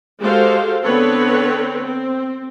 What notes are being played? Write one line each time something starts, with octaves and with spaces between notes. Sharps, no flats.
G#3 F#4 G4 A4 C5 F5
D3 B3 C4 A4 B4 C#5
C4